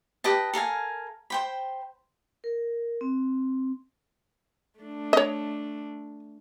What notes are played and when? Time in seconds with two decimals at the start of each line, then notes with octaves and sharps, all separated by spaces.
0.24 G4 B4 D#5 A5
0.53 A4 A#4 F5 G#5
1.30 C5 G5 B5
2.44 A#4
3.01 C4
4.79 A3 D4
5.13 C#5 D#5